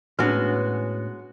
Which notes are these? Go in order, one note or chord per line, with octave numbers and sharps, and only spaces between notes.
A2 G#3 B3 C#4 D4 F#4 B4